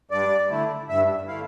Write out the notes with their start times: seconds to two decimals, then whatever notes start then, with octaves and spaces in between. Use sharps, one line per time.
0.11 G2 D5
0.50 D3 A3 E4
0.89 G2 E5
1.28 D3 A3 E4 F5